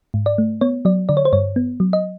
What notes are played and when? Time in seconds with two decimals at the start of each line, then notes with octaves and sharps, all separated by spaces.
0.14 G#2
0.26 D5
0.38 A3
0.61 B3 C#5
0.85 F#3 D5
1.09 D3 D5
1.17 C#5
1.25 C5
1.33 G2 C#5
1.56 B3
1.80 F#3
1.93 D#5